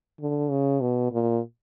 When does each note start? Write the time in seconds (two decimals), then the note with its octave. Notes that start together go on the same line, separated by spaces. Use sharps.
0.20 D3
0.51 C#3
0.81 B2
1.12 A#2